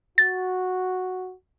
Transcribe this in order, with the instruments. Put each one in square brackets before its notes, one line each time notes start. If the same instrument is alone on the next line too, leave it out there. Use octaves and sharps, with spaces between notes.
[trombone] F#4 [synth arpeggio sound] A6